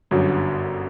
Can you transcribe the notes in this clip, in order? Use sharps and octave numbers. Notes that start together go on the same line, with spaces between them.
G1 F#2 D3 F#3 G3